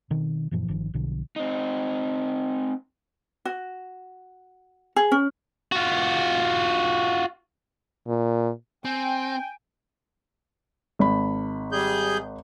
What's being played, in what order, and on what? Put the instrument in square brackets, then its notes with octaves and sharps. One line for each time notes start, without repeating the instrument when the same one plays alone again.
[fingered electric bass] B2 D#3 C4
F#2 A#2 E3 F3
G1 D#3 F3
B1 B2 D3 F3
[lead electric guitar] C4 D#4
[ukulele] F#4
G#4
C#4
[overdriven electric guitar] F4 F#4
[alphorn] A#2
[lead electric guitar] C4 [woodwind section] G5 [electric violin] G#5
[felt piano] G#1 B5
[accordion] G3 G#4 G6